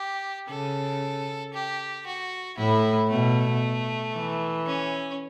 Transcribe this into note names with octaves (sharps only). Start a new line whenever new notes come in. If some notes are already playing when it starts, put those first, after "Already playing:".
Already playing: G4
C#3 A4
G4
F#4
A2 E4
B2 A3
E3
C#4